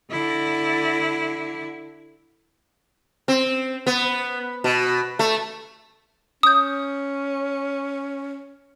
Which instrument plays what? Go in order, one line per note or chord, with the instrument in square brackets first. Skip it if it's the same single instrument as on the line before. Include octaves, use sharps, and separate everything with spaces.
[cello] D3 E4
[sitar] C4
B3
B2
A3
[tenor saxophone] C#4 [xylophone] D#6 G6